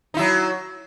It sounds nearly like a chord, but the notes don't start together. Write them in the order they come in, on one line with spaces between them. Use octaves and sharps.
D#4 E4 F#3